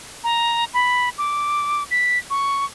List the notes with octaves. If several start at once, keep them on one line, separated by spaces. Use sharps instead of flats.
A#5
B5
D6
B6
C#6